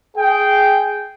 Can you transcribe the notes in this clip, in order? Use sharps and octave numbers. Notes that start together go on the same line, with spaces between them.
G#4 G5